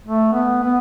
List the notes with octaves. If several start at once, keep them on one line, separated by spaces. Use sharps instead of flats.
A3
B3
B3